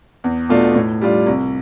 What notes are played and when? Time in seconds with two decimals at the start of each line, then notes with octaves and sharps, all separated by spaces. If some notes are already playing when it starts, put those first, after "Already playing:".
0.24 E2
0.49 B2 A3 D4 F4
0.75 A2
1.01 G3 D4 F4
1.26 C2